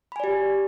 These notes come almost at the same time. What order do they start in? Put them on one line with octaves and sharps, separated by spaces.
B5 G#5 D5 G4